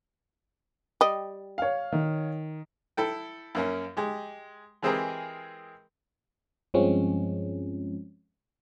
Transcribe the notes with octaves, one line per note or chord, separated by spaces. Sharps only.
G3 D#5
C#5 F5
D#3
E4 A4 G5
F#2 A#3 C#4
G#3 G4
E3 G#3 C4 G4 G#4 A#4
G2 F3 G#3 C4 C#4